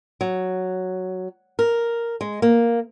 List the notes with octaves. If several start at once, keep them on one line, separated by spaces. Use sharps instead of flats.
F#3
A#4
G#3
A#3